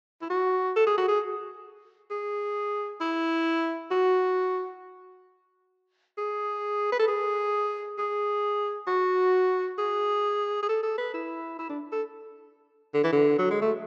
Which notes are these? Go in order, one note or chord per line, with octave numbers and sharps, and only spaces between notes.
E4
F#4
A4
G#4
F#4
G#4
G#4
E4
F#4
G#4
B4
A4
G#4
G#4
F#4
G#4
G#4
A4
A4
B4
E4
E4
D4
A4
D3
E3
D3
F#3
G#3
A3